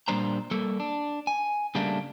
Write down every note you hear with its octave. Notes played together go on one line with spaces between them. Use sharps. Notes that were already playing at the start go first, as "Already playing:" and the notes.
A#2 G3 A#3 D4 C5 A#5
G3 A#3 A4
D4
G#5
C#3 G3 A3 A#3 D4